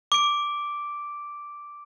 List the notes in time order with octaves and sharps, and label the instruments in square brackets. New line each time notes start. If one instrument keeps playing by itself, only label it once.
[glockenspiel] D6 D7